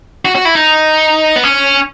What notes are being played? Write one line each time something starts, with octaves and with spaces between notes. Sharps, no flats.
F#4
F#4
E4
D#4
B3
C#4